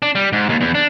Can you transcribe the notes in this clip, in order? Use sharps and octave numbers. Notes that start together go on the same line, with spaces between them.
D4
G3
G#2
D#2
E2
D4